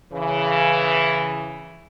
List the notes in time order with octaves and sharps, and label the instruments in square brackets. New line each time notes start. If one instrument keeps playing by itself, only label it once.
[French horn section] C#3 E3